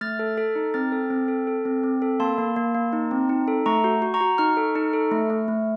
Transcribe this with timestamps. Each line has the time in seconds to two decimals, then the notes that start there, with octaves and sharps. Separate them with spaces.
0.01 A3 F6 A6
0.19 A4
0.37 A4
0.56 D#4
0.74 C4 F6 A6
0.92 A4
1.10 C4
1.28 A4
1.47 A4
1.65 C4
1.83 C4
2.02 A4
2.20 A#3 A5 C6
2.38 A#3
2.56 A#3
2.75 A#3
2.93 D#4
3.11 C4
3.29 D#4
3.48 A4
3.66 A3 A#5 C#6
3.84 F#4
4.02 F#4
4.14 A#5 C#6
4.20 F#4
4.38 D#4 C#6 F6
4.57 A4
4.76 D#4
4.93 A4
5.12 A3
5.30 A3
5.48 A3